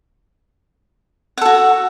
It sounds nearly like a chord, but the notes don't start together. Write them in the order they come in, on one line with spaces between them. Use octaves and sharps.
F#5 A4 F#4